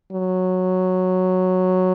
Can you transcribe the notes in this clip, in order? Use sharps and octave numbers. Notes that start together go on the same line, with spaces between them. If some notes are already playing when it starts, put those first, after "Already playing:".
F#3